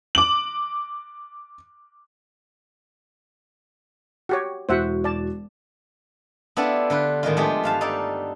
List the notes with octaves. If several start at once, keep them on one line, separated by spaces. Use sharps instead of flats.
D6 F#7
F#4 G4 C#5
E1 E4 F#4 C5 E5 F#5
D5 A5
B3 D4 E4 F4 G4 A4
D3 F4 B4
A2 D#3 G#3 F4
F3 G#3 A3 B3 G4 G#4
G2 F5 A5
D#4 A4 D5